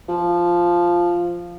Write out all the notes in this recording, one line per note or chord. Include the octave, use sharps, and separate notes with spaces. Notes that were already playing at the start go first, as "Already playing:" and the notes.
F3